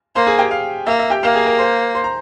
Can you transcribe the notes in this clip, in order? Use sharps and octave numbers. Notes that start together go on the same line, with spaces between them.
A#3 C5 C6
G#4 G#5
G4 G5
F5
A#3 E5
E5
G4 G5
A#3 F5
G#4 G#5
A#4 A#5
C5 C6
C5 C6
A#5